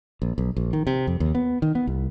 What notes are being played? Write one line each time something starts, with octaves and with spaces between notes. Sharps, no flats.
A#1
B1
A#1
D#3
C3
F2
D#2
B3
D#3
B3
C2